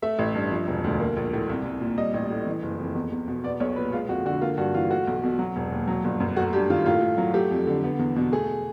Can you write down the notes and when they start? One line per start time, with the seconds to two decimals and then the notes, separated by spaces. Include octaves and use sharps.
0.02 A3 E5
0.19 A1
0.35 G2
0.52 F3
0.68 E1
0.84 D2
1.00 A#3
1.17 A#1
1.33 A2
1.49 C2
1.65 C2
1.81 A#2
1.98 G3 D#5
2.14 A1
2.30 A2
2.46 E3
2.63 F#1
2.79 F2
2.95 E2
3.12 E2
3.28 B2
3.44 B3 D5
3.60 B1 C#5
3.76 A#2 B4
3.93 G#3 F4
4.09 F2 F#4
4.26 D3 F#4
4.41 A#3 F4
4.57 G2 F#4
4.74 E3 F4
4.90 A3 F#4
5.07 B1
5.24 B2
5.39 F#3
5.56 E1
5.72 D#2
5.88 F#3
6.04 G1
6.20 F#2
6.36 A3 F#4
6.53 G2 G4
6.70 D#3 F4
6.86 A2 F4
7.02 A2
7.18 F#3
7.34 A3 G4
7.51 F2
7.67 D3
7.84 B3
7.99 E2
8.16 B2
8.33 A3 G#4